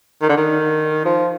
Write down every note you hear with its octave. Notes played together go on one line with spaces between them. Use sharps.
D#3
D3
D#3
F3